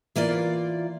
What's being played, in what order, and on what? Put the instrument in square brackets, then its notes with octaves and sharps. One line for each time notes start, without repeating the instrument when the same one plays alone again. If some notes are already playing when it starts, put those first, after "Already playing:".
[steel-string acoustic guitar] E3 A#3 F4 D5